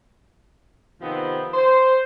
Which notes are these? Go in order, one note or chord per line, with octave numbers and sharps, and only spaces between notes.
C3 D#3 F3 B3 C4
C5